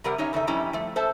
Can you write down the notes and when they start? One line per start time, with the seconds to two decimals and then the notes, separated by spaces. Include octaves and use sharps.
0.04 C3 G3 G4 A#4 F#5
0.18 C#4 D#4 C#5 E5
0.33 E2 C#3 D#4 A4 E5
0.47 F2 G3 C#4 E4 G4 A#5
0.73 F3 A3
0.96 A4 C5 E5 A5